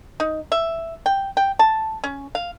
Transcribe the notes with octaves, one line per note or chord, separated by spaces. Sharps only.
D#4
E5
G5
G5
A5
C#4
F5